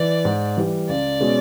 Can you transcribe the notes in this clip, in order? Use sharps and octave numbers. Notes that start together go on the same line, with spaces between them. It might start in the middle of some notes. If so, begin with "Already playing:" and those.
Already playing: E3 D5
G#2
E3 G3
C#2 D5
B2 G#3 C#4